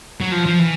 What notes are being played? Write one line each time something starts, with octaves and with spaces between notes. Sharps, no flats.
F#3
F3
F3
E3